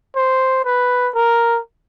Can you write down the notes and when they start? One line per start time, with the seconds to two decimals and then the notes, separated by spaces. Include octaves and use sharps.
0.16 C5
0.65 B4
1.15 A#4